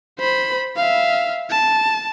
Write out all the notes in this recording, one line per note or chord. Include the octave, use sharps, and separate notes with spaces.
C5 B5
E5 F5
A5